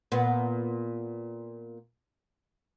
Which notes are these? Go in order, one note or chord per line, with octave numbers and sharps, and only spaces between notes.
A#2 B3